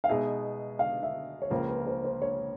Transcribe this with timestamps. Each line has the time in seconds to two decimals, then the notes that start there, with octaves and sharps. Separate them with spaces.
0.04 F5
0.08 B2 G#3 B3 D#4 G#4 E5
0.79 F5
1.03 E5
1.42 C#5
1.50 C#2 C#3 F3 A#3 C5
1.69 B4
1.87 C5
2.04 C5
2.22 C#5